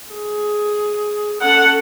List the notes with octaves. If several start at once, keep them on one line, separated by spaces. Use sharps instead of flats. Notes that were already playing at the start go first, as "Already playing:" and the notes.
G#4
C#4 A4 F#5